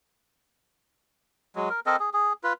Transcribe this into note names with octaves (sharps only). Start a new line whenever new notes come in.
F#3 G#3
A#4
C4 A4 A#4 D#5
G#4
G#4
F4 B4